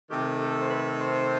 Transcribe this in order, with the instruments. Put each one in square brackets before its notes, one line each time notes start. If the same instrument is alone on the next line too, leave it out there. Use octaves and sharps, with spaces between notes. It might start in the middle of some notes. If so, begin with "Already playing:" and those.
[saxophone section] C3 D#3 A3 G4
A4
C5
B4
C5